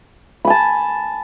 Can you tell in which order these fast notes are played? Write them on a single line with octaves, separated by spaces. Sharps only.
B5 G#5 A5